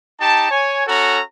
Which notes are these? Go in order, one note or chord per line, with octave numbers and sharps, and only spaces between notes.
D#4 G4 A5
C#5 G#5
C#4 F#4 A4 A#5